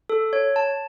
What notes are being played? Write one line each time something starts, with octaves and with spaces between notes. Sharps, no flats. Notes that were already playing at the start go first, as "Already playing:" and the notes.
A4
C#5
A5